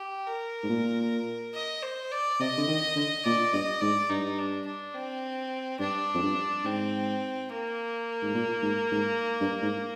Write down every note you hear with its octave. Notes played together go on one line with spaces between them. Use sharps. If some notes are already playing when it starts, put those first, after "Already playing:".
Already playing: G4
A#4
G#2
A#2
D#5
C5
D5
C3 D#5
D3
D#3
D3
A#2 D5
G2 D#5
G#2 D5
G2 D#4
D4
D4
C4
G2 D4
F2
G2
G#2 C4
A#3
G#2
A#2
G#2
G#2
G2
G#2